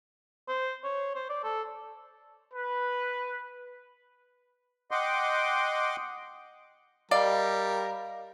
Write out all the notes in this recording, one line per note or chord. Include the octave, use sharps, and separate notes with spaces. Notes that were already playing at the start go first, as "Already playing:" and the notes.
C5
C#5
C5
D5
A4
B4
D#5 F#5 G5 C6 D6
G3 A#4 D5 D#5 F5